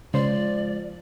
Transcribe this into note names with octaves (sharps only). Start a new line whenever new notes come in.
C#3 F3 G#3 C5 D5